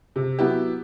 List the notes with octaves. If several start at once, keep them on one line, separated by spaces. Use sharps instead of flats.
C3
F#3 B3 E4 G4